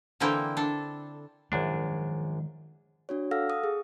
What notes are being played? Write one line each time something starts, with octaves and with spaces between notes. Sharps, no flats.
D3 E3 A#3 C4 E4 G5
D4 A4
A#1 F#2 D#3 F3 G#3 D4
D4 F#4 C#5
A4 F5 F#5 E6 F6 A#6
D#6
G#4